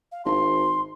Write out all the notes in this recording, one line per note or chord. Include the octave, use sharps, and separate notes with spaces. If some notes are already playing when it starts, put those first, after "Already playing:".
F5
G#1 C6